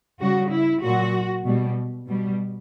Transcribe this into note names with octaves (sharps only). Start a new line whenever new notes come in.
C#3 G3 F#4
E4
A#2 F#3 F#4
B2 G3
B2 G3